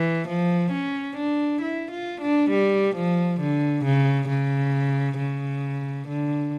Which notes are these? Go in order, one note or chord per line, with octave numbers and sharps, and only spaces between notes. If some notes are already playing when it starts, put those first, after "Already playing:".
Already playing: E3
F3
C#4
D4
E4
F4
D4
G3
F3
D3
C#3
C#3
C#3
D3